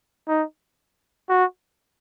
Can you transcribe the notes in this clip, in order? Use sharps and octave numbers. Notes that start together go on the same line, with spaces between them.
D#4
F#4